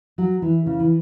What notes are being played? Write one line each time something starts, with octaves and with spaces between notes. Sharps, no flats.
F#3
E3
C#3
E3